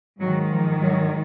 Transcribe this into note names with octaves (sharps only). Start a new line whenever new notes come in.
G#2 D#3 F#3
F3
F#3